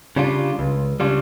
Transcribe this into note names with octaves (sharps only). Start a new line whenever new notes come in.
C#3 G3 D4 F4
C#2
C#3 G3 D4 F4